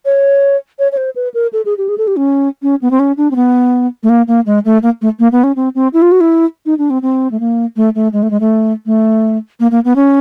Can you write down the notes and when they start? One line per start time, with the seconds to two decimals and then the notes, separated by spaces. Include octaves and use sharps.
0.05 C#5
0.79 C#5
0.92 C#5
0.97 C5
1.16 B4
1.34 A#4
1.53 A4
1.65 G#4
1.78 G4
1.89 G#4
1.98 A4
2.07 G4
2.16 C#4
2.62 C#4
2.82 B3
2.91 C4
2.99 C#4
3.17 D4
3.31 C4
3.36 B3
4.03 A3
4.09 A#3
4.28 A#3
4.46 G#3
4.65 A3
4.83 A#3
5.02 A3
5.19 A#3
5.32 B3
5.44 C#4
5.56 C4
5.75 C4
5.93 E4
6.02 F4
6.12 F#4
6.20 E4
6.66 D#4
6.78 D4
6.90 C4
7.02 C4
7.31 A3
7.40 A#3
7.76 A3
7.95 A3
8.13 G#3
8.23 A3
8.31 G#3
8.40 A3
8.86 A3
9.60 A#3
9.71 A#3
9.85 B3
9.96 C#4